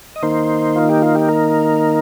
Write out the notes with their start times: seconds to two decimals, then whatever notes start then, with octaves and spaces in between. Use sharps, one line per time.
0.16 D#5
0.23 D#3 A#3 D#4 C5
0.76 F4
0.89 G4
1.02 F4
1.15 G4
1.29 A#4